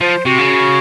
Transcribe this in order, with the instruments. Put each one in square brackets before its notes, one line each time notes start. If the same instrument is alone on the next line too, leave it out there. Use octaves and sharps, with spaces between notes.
[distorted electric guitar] F3 [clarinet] C5
[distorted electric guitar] C3 [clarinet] F#4
[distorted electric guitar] C#3